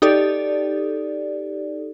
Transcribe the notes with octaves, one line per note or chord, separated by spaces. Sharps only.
D#4 G4 A4 D5